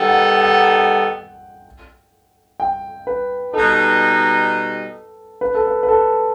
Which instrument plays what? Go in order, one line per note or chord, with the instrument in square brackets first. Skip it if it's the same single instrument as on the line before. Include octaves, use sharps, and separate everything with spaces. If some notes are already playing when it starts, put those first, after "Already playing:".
Already playing: [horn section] D#3 G3 B3 D#4 A4 [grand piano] G5
[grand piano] F#5
F#5
G5
B4
[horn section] B2 G3 D#4 [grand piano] A4
[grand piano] B4
A4
B4
B4
A4